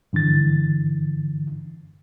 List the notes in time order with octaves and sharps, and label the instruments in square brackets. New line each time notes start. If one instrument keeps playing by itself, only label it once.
[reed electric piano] G2 D3 E3 A6